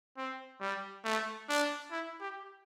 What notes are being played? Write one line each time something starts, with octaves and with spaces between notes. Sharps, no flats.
C4
G3
A3
D4
E4
G4